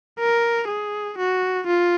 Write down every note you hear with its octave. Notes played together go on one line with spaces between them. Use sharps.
A#4
G#4
F#4
F4